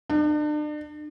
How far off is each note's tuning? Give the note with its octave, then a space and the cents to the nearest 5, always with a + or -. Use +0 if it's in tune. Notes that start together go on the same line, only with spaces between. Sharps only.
D4 +40